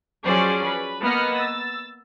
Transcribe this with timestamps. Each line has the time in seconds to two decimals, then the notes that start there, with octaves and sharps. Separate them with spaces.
0.24 F3 F#3 C#4 G#4 C5 D5
0.65 B4
1.01 A#3 B3 B4 D#5 F6 C#7
1.35 E6 A6